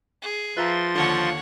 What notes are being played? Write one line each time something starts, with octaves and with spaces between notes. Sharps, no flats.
G#4
F3 F4 B4 E5 A#5 C6 A6
D#2 D3 C#5 F#5